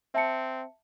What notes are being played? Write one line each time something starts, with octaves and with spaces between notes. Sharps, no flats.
C4 E5 A5 C#7